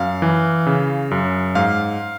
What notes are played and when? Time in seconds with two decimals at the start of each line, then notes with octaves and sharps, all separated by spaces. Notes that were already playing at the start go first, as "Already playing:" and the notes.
Already playing: F#2 F5
0.22 E3
0.66 C#3
1.11 F#2
1.55 G#2 F5